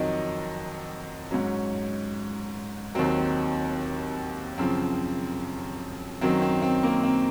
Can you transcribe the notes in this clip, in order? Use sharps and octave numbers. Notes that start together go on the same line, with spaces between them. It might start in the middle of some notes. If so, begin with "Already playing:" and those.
Already playing: F2 D#3 F#3 D#4
G#2 F#3 C#4
D#2 D#3 F#3 C4
F#2 C#3 F3 C4
F#2 D#3 F#3 C4
C4
C4
A#3
C4